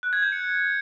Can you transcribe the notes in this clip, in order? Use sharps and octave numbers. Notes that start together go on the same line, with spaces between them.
F#6
G#6
G6
C#7